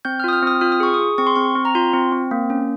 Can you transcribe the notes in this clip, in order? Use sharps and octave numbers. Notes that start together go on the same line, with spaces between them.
C4 G6
F6
F4 D#6
F6
C4 D#6
F4 F6
D#6
G#4 C#6
D#6
G#4
C4 C#6
C6
C4 C#6
C4
A#5
F4 C6
C4
C4
A#3
C#4